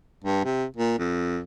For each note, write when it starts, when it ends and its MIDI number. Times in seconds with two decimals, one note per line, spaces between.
0.24 0.42 43
0.45 0.64 48
0.76 0.95 46
0.99 1.39 41